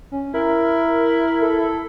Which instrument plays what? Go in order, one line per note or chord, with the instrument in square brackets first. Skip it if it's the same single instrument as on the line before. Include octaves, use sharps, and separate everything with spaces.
[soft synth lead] C#4
[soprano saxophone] E4 [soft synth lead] A#4
[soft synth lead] A4